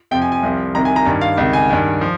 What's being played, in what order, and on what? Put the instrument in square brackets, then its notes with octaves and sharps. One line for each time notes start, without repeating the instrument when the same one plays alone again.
[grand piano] F2 C3 F3 G5
G#5
G#5
C2 C3 F3
C2 C3 D#3 A#5
G#5
A#5
G2 D#3
F5
C#2 C3 D#3
G#5
G2 D#3
F3